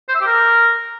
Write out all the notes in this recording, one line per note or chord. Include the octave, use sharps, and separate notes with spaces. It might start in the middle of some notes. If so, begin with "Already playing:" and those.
C5
E5
G4
A#4